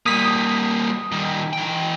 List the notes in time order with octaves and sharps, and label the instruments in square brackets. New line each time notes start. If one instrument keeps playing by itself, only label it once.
[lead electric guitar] G3 A#3 [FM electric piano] D#6 B6
[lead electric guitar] D#3 G3
E3 G5